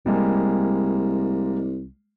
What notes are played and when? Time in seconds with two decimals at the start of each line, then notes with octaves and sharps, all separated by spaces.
0.06 C2 G3 G#3 A#3